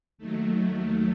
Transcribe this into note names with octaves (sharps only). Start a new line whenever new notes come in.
D#2 D#3 F#3 A3